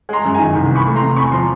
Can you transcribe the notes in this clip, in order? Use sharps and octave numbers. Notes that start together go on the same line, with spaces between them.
G#3 A#5 C6
F#2
G#5 A#5
D#3
C2
E3
B5 C#6
A3
A#5 C6
C3
E2 B5 C#6
F3 A#5 C6